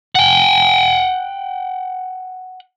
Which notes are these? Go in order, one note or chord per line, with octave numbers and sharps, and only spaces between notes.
F#5 G5